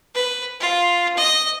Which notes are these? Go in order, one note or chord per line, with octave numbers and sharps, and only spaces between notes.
B4
F4
D#5